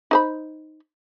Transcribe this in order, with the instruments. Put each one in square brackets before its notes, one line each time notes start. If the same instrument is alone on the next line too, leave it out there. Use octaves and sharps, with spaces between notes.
[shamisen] D#4 C5 B5